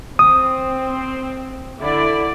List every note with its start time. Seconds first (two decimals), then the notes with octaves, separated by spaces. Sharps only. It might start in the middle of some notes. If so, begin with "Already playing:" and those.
0.19 C4 D#6
1.80 D3 E4 D5